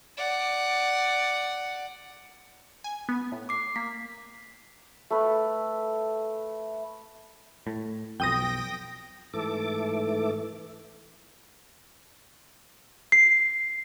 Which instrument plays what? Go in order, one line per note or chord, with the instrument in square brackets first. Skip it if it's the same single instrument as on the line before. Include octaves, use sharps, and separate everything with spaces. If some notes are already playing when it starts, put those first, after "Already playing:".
[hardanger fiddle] D5 F#5
[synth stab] G#5
B3
A2
[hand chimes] D6 C7
[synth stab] A#3 [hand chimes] B6
[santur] A3 B4
[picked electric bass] A2
[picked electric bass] B1 F2 [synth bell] G5 D#6 A#6
[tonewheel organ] G#2 E3 A3 A4 D6
[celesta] C7